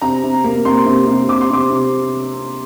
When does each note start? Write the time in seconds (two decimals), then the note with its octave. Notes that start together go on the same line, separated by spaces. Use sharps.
0.02 C3 A#5
0.23 C3
0.44 A#3
0.65 C3 C6
0.86 C3
1.07 C3
1.28 C3 D6
1.41 C6
1.50 C3 D6
1.70 C3